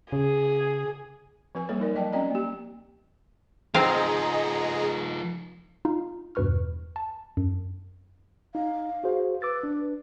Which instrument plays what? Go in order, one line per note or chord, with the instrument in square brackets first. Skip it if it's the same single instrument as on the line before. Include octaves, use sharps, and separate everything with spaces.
[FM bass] C#3 [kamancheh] G#4
[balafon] F3 C4 B4 G#5
G3 A#3 A4 C#5
D#4 A#4 D5
F#3 D#5 G5 A5
C4 C#4 D5 D#5 G5 A#5
A#3 G4
[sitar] G#2 [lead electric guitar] F3 D#4 [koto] C4 F5 [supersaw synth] G#4 D#5 A#5
[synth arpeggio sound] D#4 F4 F5
E2 G2 B2 B4 C#6 F6
A5
F#2
[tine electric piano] D#4 [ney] F5
[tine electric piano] F#4 G#4 C5
[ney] B4 [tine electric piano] D6 E6 A6
[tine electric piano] D4